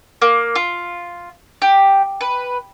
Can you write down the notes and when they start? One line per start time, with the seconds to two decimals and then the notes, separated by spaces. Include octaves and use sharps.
0.22 A#3
0.55 F4
1.62 G4
2.21 B4